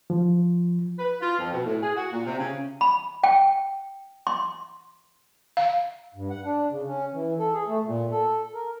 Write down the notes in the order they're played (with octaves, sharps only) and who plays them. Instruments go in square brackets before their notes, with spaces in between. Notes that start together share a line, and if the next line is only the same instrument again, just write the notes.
[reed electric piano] F3
[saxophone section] B4
F4
F2
B2
A2
G#4
F#4
A#2
C3
C#3
[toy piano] B5
G5
C6
[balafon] F5
[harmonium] G2
F#5
D4
C#3
C#4
E3
A4
G#4
A3
A#2
A4
A#4